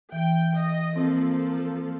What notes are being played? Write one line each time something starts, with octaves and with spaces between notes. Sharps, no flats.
E3 G5
D#5
F3 A#3 C4 A4